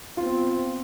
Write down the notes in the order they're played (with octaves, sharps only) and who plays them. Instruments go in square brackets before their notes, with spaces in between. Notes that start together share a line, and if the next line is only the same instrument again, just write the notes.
[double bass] B3 C4 [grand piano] F4